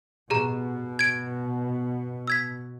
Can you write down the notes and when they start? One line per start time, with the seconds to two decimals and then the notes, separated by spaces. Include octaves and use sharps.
0.30 B2 G4 G#4 A#5
0.99 G#6 D7
2.27 E6 G#6 B6